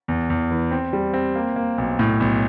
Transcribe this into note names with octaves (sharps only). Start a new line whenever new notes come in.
E2
E2
E3
C4
G3
C4
A#3
A#3
B1
A2
B1